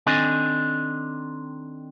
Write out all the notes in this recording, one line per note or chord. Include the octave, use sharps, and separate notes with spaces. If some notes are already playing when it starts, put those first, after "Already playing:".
D#3 C4 D4 A4 D#5 G#5